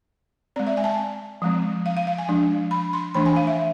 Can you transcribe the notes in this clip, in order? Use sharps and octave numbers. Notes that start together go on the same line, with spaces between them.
G#3 C4 D5
E5
G#5
A5
G#5
F3 G#3 C4
F5
F5
F5
G#5
F3 G#3 D4
B5
C6
E3 A3 D4 B5
G#5
F5
E5